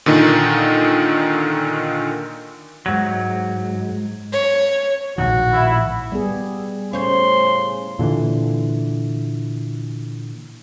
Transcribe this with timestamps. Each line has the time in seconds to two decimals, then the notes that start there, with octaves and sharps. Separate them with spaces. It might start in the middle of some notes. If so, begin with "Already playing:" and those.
0.06 A#2 D3 D#3 D#4
2.86 G#2 F#3
4.33 C#5
5.18 A#1 A2 D#3 F#4
5.52 E4
6.12 G3 B3 G#4
6.93 A2 C#3 C#4 C5 C#5 C6
7.99 A#2 D3 E3